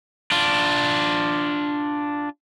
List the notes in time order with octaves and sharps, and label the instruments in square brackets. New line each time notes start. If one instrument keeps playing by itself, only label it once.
[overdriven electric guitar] D4 F4